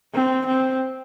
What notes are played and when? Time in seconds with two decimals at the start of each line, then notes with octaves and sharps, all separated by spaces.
0.14 C4
0.46 C4